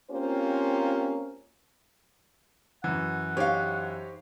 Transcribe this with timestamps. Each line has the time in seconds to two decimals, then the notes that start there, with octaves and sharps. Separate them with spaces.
0.11 A#3 C4 C#4 F4 G4 C5
2.84 F#2 E3 F#5
3.37 D#4 G4 C5 C#5 F5